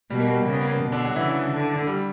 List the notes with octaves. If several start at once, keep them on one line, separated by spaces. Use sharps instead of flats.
B2 G3
A#3
G3
C#3 A#3
B3
A#3
B2
D3 D4
F#3 F#4
C#3 E3 E4
D3
G3